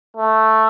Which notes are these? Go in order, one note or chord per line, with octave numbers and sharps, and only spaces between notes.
A3